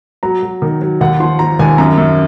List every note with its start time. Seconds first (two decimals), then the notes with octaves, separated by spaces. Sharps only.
0.23 F#3 A#5
0.43 F#3
0.62 D#3
0.81 F#3
1.01 D#2 F#5
1.20 F3 C6
1.39 F3 A#5
1.59 D#2 G#5
1.78 F#2 A#5
1.98 F#2